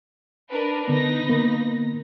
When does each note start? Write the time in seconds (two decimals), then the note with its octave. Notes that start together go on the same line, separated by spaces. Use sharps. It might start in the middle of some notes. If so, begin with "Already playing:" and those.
0.50 D4 A#4 B4
0.88 D3 B3 D#4 B4 A#6
1.28 D3 A#3 B3